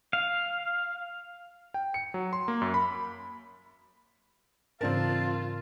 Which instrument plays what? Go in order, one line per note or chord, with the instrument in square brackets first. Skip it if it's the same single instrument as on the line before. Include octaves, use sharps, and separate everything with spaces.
[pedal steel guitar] F5
[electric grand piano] G5
C#7
F#3
C6
A#3
F#2
B5
[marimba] G#2 C#3 E3 [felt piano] C4 D4 A#4 [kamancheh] F4 [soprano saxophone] A5